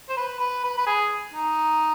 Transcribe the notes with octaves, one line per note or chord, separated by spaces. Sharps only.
C5
B4
B4
B4
B4
G#4
D#4